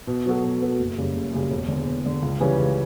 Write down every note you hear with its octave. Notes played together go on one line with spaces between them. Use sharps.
B2
F#3 B3 F#4 A4
B2
F#3 B3 F#4 A4
F#1
F#2 C#3 G3
F#1
F#2 C#3 G3
E1
E2 D3
E1
E2 D3
C#2
C#3 E3 G3 C#4
C#2